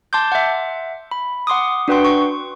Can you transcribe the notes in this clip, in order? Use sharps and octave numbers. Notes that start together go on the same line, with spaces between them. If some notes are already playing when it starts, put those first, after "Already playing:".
A5 C6 D6 G6
E5 F#5
B5
F#5 C6 D6 D#6
D4 F#4 B4 F#5 G5 C6
C#6